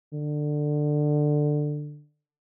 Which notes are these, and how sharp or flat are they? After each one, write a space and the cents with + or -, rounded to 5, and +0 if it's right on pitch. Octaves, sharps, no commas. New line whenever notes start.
D3 +15